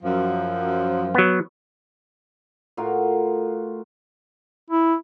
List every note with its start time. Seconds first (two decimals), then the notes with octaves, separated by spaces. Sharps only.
0.03 F#2 F3
1.15 F#3 B3
2.77 A2 F4 F#4 A#4
4.70 E4